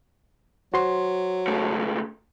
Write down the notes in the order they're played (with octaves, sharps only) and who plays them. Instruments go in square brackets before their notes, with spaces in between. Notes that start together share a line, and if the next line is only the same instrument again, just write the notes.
[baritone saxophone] F#3 [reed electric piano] F#4 C5 C6
[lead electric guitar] C#2 A3